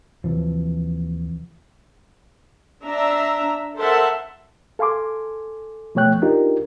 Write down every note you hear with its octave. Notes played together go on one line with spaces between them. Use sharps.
D#2 C3 E3 F3
D4 E5 A#5
A4 A#4 C5 E5 F#5 A5
A4 F5 G#5 C6 D6
B2 F3 A3 C#5 G5 F#6
D4 D#4 F4 G4 A#4